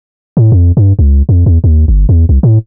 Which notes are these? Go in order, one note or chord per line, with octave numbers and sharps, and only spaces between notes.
A2
F2
G2
C#2
F2
E2
D#2
G1
E2
C2
A2